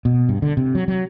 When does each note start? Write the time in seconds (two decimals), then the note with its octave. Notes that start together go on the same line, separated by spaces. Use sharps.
0.05 B2
0.29 G2
0.42 D3
0.57 C3
0.75 F#3
0.88 F#3